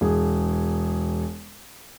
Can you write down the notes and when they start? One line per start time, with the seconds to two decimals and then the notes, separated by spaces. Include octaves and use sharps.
0.01 E1 G#4